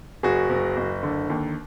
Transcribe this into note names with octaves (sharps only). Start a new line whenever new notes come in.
F#1 F#4 G#4
F#1
F#1
D3
D#2